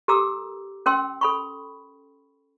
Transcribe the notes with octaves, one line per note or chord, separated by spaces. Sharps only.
G4 A4 A#4 A#5 D6 E6
C#4 A#4 G5 C6 E6
A4 B5 C#6